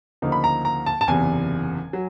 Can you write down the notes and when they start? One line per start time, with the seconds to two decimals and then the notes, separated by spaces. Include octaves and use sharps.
0.22 D2 C#3 F3 A#3 D#4
0.32 B5
0.44 A#5
0.65 A#5
0.86 A5
1.01 A5
1.07 F#1 E2 C3 E3 G#5
1.93 F#3